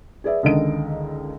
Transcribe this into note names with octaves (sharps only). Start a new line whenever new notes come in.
G#4 B4 D5 E5
C#2 D3 D#3 D#5 D7